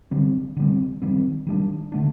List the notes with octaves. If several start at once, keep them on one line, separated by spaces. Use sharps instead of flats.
D3 G3 C4
D3 G3 C4
D#3 G3 C4
D#3 G3 D4
D3 A3 D4